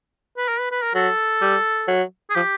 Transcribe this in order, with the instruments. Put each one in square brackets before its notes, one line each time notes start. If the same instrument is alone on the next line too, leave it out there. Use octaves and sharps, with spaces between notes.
[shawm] B4
A#4
B4
B4
A#4
[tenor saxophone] F#3 [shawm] A4
[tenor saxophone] G3
F#3
[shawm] G#4
[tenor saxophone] F3 [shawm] G4